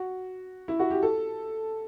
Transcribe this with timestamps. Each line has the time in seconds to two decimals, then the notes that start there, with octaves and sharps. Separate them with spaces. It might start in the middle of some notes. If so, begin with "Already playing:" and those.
Already playing: F#4
0.68 E4
0.79 F#4
0.90 G4
1.02 A4